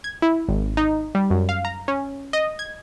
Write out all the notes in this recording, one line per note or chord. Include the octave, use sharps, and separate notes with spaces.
G#6
E4
G#1
D#4
G3
F#2
F5
A#5
C#4
D#5
G#6